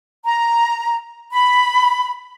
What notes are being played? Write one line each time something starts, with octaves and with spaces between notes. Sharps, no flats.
A#5
B5